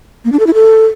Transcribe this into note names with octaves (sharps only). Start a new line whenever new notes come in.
A#3
D4
A4
E4
A4